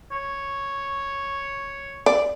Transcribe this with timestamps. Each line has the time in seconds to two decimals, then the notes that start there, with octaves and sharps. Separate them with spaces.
0.12 C#5
2.06 D5